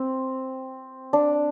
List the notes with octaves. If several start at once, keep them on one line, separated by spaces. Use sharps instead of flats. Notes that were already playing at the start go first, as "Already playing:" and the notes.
Already playing: C4
D4